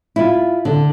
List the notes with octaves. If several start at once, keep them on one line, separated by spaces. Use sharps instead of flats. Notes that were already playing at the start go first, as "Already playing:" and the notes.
E4 F4
D3